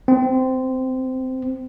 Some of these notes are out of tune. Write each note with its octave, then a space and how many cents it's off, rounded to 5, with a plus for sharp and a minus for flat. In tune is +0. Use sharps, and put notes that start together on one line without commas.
C4 -15